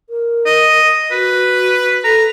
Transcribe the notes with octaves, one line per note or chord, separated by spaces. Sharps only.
A#4
D#5
F#4 B4
A4 A#5